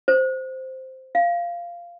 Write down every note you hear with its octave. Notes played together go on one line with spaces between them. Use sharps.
C5
F5